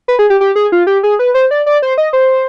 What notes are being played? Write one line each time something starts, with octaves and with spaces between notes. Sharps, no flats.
B4
G#4
G4
G4
G#4
F4
G4
G#4
B4
C5
D5
D5
C5
D#5
C5